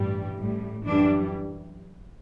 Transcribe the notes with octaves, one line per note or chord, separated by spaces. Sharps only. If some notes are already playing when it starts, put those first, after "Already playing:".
Already playing: A1 G2 E3 G3
A1 A2 G3
F#2 E3 G3 D4